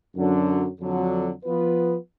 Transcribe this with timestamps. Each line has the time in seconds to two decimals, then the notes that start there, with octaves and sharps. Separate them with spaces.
0.15 F#2 D3 F#3 D4
0.79 F2 D3 F#3
1.44 F3 B3 F4 B4